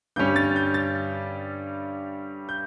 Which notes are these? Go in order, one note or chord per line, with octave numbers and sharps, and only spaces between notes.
G2 D3 G3 C#4 G6
A6
G6
A6
G6